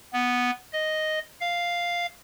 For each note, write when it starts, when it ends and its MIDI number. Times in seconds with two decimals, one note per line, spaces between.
0.13 0.51 59
0.73 1.19 75
1.41 2.06 77